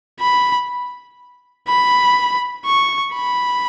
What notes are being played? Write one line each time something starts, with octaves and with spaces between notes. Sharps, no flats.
B5
B5
C#6
B5